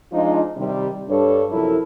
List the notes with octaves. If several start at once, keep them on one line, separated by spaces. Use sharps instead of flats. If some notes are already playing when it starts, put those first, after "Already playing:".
F3 G#3 D4 D#4 F4
C3 D#3 G3
G2 G3 D4 A4 C#5
F#2 C3 F3 E4 A4 A#4